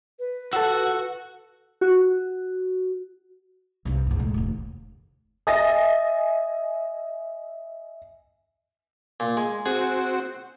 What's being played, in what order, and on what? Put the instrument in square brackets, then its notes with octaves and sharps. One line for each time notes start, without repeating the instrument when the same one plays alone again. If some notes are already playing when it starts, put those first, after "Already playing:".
[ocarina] B4
[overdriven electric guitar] F#4 F#5 [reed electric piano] A4 E6
[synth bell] F#4
[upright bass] C2 G2
E2 G2
A2 G#3
F1 D#2
[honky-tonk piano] D#5 E5 G#5 A6 A#6
[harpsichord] A#2
G#3
[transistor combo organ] C4 F#4 [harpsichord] G#4